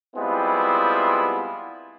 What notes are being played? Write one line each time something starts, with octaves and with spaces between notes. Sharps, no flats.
G3 G#3 B3 C4 E4 F4